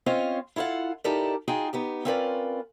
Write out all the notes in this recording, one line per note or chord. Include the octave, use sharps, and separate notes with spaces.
C4 C#4 F4 C5 C#5 D#5
E4 F4 A4 F5 F#5
D#4 E4 G4 A4 A#4 D5
D#4 F4 F#4 G#4 G5 G#5
B3 D#4 G4
C4 C#4 F4 A#4 B4 D5